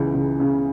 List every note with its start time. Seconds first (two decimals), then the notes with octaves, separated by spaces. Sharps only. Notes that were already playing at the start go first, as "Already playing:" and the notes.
Already playing: C#2 C#3 E3
0.14 C#2
0.40 C#3